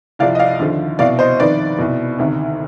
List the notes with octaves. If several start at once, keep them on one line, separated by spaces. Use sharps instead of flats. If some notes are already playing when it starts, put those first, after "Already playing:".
C2 C3 F3 D5 F5
D#5
D5 F5
D#2 D3 F3
C2 B2 D5 F5
C5 D#5
F2 D#3 B4 D5
C2 B2
D2 C3 D#3